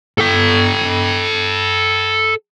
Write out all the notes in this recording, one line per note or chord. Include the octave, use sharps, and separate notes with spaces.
A4 G5